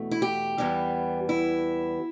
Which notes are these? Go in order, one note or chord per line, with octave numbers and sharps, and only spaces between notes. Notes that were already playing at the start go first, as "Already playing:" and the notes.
Already playing: E2 B2 A3
E4
G4
E2 E3 G3 B3
E4